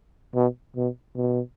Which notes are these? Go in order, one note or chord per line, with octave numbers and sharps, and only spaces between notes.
B2
B2
B2